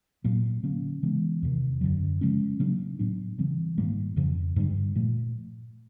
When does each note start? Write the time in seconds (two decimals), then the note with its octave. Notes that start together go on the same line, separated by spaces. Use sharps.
0.24 A#2 F#3 A#3
0.63 D3 F#3 A#3 C#4
1.03 C#3 E3 G#3 B3
1.43 E2 C3 D#3
1.81 F#2 D3 F#3
2.21 C#3 F3 G#3 C#4
2.59 C#3 F#3 A#3 D4
2.99 A2 F#3 B3 D4
3.38 C#3 E3 G3 C4
3.78 G#2 D#3 G3 A#3
4.16 F2 C#3 F3
4.56 G2 D3 G3
4.95 A#2 F3 A3